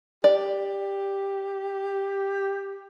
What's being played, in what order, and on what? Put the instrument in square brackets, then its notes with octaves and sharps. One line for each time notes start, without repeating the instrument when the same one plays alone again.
[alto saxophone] G4 [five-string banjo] D5